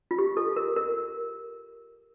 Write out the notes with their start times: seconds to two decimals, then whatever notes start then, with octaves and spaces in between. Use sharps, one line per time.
0.11 F4
0.19 G4
0.37 A4
0.56 A#4
0.76 A#4